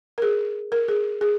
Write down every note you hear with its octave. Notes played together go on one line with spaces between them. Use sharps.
A#4
G#4
A#4
G#4
G#4